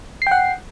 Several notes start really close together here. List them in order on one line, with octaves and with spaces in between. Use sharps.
C7 G5 F#5